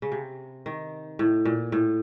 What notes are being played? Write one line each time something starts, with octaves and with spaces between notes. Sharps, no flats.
C#3
C3
D#3
A2
A#2
A2